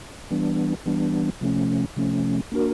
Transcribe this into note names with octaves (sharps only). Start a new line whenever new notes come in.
E3 G3 B3 D4
E3 G3 B3 D4
C3 F3 A3 C#4
C3 F3 A3 C#4
A#3 D4 F#4 A#4